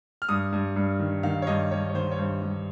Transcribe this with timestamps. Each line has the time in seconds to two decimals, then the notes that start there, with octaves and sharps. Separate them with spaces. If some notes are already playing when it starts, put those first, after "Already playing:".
0.22 F6
0.29 G2 D#6
0.53 G2
0.76 G2
1.00 D#3
1.23 D#3 F5
1.42 C#5
1.47 G2 D#5
1.71 G2 C#5
1.90 C#5
1.94 D#3 C5
2.11 C#5
2.18 G2 C5
2.42 G2